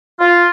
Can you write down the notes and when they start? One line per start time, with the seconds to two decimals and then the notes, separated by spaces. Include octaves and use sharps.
0.20 F4